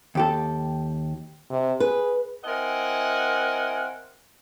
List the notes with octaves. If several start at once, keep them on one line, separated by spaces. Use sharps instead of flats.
D#2 G4 A4
C3
G#4 B4
C4 E4 A#4 D#5 F#5 G#5